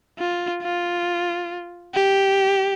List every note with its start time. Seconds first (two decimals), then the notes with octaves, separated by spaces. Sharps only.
0.18 F4
0.62 F4
1.94 G4